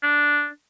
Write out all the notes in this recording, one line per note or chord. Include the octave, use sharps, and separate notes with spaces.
D4